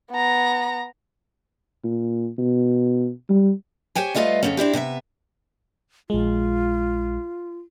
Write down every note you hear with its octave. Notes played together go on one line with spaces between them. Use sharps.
B3 A#5
A#2
B2
G3
G4 C5 C#5 G5 G#5
G3 A3 F4 B4 D#5 F5
F2 G#2 C#3 B3 C#4
C4 D4 E4 G4
C3 B3 D5 E5
A#1 G#3 F4